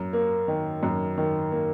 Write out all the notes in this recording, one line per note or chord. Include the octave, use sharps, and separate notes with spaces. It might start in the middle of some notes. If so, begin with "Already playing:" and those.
Already playing: F#2
A#3
D#3
F#2
D#3
A#3